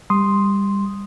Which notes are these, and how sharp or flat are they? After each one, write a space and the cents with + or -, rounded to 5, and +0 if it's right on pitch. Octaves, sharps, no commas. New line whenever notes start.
G3 +20 C6 +0 D#6 -5